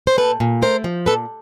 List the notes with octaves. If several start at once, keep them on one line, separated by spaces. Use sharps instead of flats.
C5
A#2 A4 B4
A#2
A3 A#4 C5
F3
A#2 A4 B4